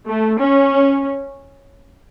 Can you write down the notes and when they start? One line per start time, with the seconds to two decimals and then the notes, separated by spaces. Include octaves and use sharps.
0.08 A3
0.40 C#4